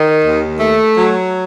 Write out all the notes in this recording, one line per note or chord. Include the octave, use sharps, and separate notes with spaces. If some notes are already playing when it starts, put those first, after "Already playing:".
Already playing: D#3
D#2
A3
F#3